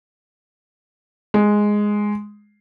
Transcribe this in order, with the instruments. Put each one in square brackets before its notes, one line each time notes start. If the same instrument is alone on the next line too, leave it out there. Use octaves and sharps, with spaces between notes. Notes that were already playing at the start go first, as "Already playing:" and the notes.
[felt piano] G#3